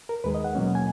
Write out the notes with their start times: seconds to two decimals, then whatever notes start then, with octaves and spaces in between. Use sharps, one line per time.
0.09 A#4
0.24 D#2 D#3 G#3 B4
0.35 D#5
0.44 F#5
0.55 B2 F#3 A#3 C#4
0.75 G#5